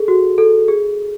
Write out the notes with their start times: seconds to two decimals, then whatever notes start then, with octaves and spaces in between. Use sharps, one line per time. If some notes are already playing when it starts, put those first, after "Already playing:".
Already playing: G#4 A4
0.08 F#4
0.38 A4
0.68 G#4